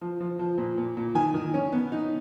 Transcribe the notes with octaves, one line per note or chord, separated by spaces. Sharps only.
F3
F3
F3
A#2
A#2
A#2
D#3 G#5
D#3
C#4
B3
D#4